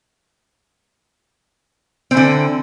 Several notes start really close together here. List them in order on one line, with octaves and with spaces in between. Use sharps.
C4 E3 D3